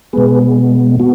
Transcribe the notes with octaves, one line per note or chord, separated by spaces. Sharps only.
B2 G#3 B3 G#4 B4
B3 F#4